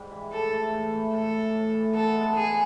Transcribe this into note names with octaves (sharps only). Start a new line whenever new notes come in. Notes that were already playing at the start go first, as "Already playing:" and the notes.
Already playing: G#2 G3
E3
A2 A4
A3
A2
E3
A2 A4
A3
A2
E3
B3 A4
G#3
A2 G#4